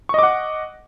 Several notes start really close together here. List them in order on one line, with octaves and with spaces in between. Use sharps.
C#6 D#5 D6 F#5